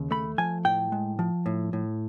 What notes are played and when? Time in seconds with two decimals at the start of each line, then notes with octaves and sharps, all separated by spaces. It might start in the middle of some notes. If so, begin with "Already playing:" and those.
Already playing: D#2 C#3
0.11 A3 B5
0.38 F3 G#5
0.65 A2 G5
0.92 G#3
1.19 F3
1.46 A2
1.73 A2